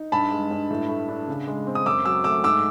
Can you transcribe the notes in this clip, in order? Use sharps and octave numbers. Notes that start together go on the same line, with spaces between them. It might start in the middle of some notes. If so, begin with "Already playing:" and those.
Already playing: D#4
G2 A5 B5
G#3
G2
A2
A3
D4
C#3
G#3
C4
D#6
F#2 D6 E6
F#3 D6 E6
A3 D6 E6
G#2 D6 E6